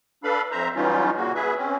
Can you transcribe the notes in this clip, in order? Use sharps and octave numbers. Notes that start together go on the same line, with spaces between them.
D4 A4 B4 F5 B5
F2 C5 E5 A#5
E3 F#3 G3 C#4 D#4 F4
A#2 C#3 A#3 F#4
G#4 B4 E5
C4 C#4